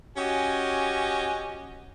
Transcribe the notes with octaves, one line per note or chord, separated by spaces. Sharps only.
C#4 F#4 G4 D#5 G#5